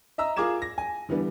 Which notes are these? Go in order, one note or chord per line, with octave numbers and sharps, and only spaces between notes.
D#5 E5 A#5 E6
F4 G#4 A#4 D6 G#6 E7
A#6
G#5
D3 E3 G3 B3